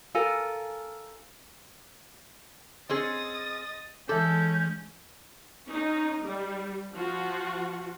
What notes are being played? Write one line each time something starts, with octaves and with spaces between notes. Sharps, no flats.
F4 A4 A#4 G#5
C4 C#4 G#4 D#5 D#6 A6
E3 G#3 C#4 A4 D6 G6
C#4 D#4
G3
F3 F4 F#4